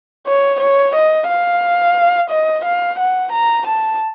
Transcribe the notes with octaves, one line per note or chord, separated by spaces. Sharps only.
C#5
C#5
D#5
F5
D#5
F5
F#5
A#5
A5